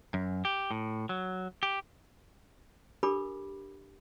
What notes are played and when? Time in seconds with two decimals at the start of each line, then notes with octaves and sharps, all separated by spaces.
0.14 F#2
0.45 G4
0.71 A2
1.09 F#3
1.63 G4
3.03 D4 G4 A4 A#4 B5 D6